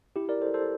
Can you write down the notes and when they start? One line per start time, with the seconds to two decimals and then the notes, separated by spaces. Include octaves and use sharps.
0.16 E4 G4
0.29 A#4 D5
0.41 A4 C5
0.54 A4 C5